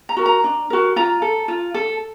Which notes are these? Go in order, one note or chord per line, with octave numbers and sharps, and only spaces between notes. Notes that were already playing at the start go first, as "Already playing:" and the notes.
A#5
F#4 A#4
A#5
D4
F#4 A#4
F4 A#5
A4
F4
A4